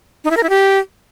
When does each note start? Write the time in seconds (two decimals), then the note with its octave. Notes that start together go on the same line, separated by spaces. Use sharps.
0.24 D#4
0.31 E4
0.37 A#4
0.43 E4
0.49 G4